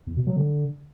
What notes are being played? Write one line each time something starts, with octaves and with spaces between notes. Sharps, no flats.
E2
B2
F#3
D3